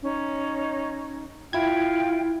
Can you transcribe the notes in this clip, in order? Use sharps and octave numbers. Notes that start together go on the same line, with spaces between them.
C#4 D#4
E4 F4 E5 G5 G#6